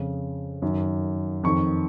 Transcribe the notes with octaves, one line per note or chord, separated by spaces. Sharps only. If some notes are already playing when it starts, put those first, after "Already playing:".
Already playing: F2 C#3
F#2 D#3
F2 D#3 C#6